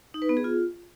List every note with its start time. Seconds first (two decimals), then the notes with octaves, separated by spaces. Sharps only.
0.14 D#4
0.22 B4
0.29 B3
0.37 G#4
0.44 F4